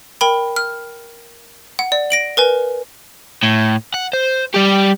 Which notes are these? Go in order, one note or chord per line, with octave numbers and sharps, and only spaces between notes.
A#4 G5 B5
F6
F#5
D5
A#6 D7 F#7
A#4 B4 G#5
A2
F#5
C5
G3 G4